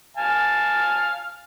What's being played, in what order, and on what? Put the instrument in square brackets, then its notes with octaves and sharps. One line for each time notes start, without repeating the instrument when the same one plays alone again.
[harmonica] F5 G#5 A5